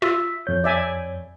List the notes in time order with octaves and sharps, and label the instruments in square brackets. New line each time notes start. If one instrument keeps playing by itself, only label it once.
[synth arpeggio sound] F4 [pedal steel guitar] E5 E6
[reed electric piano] F2 C#5 [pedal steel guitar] G6
[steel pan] D5 E5 G#5